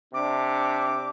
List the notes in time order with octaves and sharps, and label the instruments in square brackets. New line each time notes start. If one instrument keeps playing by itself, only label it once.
[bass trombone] C3 [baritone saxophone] D4 [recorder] D6